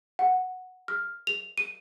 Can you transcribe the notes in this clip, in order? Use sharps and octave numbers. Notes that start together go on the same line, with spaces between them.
F#5
F6
F7
D#7